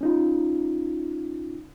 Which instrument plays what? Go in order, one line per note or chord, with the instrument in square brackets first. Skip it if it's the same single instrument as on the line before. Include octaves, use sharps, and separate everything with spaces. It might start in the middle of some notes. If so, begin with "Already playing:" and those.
[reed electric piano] C#4 D#4 F4